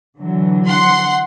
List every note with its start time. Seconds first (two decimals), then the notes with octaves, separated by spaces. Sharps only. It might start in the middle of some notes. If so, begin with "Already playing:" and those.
0.17 D3 E3 F#3
0.68 F#5 C6